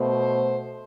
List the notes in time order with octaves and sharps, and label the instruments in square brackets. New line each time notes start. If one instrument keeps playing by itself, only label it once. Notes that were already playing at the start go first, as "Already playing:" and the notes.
Already playing: [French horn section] B2 A3 C5